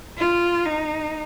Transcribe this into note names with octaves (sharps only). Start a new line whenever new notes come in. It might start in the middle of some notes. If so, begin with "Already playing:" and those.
F4
D#4